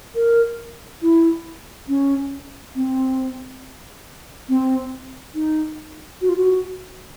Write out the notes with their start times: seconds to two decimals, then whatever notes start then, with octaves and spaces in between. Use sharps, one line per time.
0.15 A#4
1.02 E4
1.88 C#4
2.75 C4
4.49 C4
5.35 D#4
6.22 F#4
6.29 F4
6.37 F#4